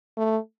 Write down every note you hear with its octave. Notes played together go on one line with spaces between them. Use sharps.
A3